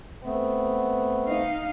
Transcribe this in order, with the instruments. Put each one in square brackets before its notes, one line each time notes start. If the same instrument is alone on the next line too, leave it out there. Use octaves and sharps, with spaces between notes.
[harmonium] A3 C4 [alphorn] B3
[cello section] D#4 F5